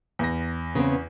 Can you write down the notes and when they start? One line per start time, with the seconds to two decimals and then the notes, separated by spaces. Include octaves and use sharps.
0.19 E2 A#6
0.75 C#3 B3 C4